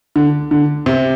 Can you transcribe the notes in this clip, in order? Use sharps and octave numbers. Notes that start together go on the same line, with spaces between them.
D3
D3
C3